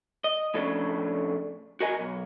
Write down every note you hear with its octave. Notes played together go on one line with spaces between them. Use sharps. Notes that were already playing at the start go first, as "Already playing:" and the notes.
D#5
F2 A2 C#3 A3 D4
F#4 A#4 D#5 G#5
B1